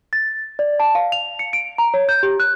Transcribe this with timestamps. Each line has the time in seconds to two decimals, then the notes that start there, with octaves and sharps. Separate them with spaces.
0.13 A6
0.59 D5
0.80 A5
0.95 F5
1.12 F7
1.39 C#7
1.53 D7
1.78 A#5
1.94 C#5
2.09 G6
2.23 G4
2.40 F#6